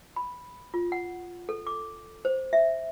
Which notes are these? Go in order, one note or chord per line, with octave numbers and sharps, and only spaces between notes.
B5
F4
F#5
A4
D6
C5
E5